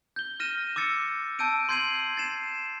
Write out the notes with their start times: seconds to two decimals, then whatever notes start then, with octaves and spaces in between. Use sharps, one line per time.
0.16 G6 G7
0.40 F6 A#6 D#7 E7
0.76 D6 E6 A6 C#7
1.39 A5 E6 G6 D7 D#7
1.69 C6 G6 G#6 C7 D#7 F#7
2.17 A6 C7 E7